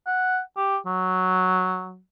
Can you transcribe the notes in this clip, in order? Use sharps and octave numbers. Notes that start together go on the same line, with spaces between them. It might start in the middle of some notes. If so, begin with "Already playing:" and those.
F#5
G4
F#3